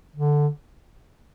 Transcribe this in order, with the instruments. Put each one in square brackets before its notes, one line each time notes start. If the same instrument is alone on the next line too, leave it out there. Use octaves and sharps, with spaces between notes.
[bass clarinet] D3